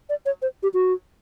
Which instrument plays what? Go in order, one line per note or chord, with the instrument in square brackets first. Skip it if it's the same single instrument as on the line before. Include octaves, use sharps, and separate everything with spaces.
[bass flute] D5
C#5
C5
G4
F#4